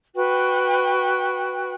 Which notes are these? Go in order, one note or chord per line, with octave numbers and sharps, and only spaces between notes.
F#4 B4 G5